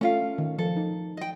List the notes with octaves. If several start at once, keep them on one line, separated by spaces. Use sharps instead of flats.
A3 C#4 F4 F5
D#3
F3 A4
D#4
D#5 G5